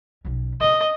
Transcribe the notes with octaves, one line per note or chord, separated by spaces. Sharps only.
B1 C#4
C#4 D4 D#5